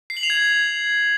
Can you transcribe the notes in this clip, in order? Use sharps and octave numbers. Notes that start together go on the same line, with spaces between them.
C7
F#7
F7
G#6